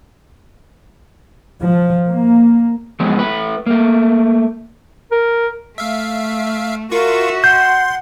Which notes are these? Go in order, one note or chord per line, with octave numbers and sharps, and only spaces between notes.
F3
A#3
F3 F#3 G#3 B3
A3 B4
A3 A#3
A#4
A3 E5 F5
F4 F#4 A#4 E5 C#6
F#5 C6 G6